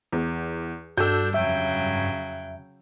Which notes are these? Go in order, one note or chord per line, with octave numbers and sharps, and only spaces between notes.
E2
G2 D4 F#4 A4 E6 G6
F2 C#3 F#3 E5 G5